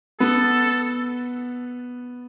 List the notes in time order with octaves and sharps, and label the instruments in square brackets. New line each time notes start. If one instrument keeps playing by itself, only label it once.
[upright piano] B3 [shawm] A4